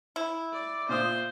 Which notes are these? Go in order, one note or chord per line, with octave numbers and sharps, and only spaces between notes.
E4
D5
A#2 F4 C5 D#6